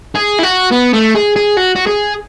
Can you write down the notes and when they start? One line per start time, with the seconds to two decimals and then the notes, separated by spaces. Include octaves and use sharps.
0.15 G#4
0.39 E4
0.43 F#4
0.72 B3
0.94 A3
1.15 G#4
1.36 G#4
1.57 F#4
1.75 F#4
1.86 G#4